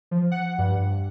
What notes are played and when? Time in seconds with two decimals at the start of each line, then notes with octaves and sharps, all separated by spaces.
0.11 F3
0.32 F#5
0.58 G2